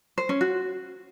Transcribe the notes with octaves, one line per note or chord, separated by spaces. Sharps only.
C5
C#4
F#4